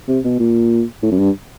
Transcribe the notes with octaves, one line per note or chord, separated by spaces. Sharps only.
C3
B2
A#2
A2
F#2
G2